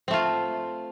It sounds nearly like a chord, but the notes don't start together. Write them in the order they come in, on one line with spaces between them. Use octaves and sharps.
C4 A3 F4